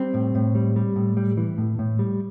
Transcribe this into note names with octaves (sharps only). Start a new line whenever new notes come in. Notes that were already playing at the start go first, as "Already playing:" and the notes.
Already playing: G3 C4
A2
A2
G3
G3
A2
G3
E3
A2
A2
G3